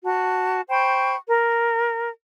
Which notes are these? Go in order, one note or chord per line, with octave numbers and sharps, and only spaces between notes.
F#4 A5
C5 G5 B5 C#6
A#4